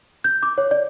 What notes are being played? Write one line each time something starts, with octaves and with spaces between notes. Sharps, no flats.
G6
D6
C#5
D5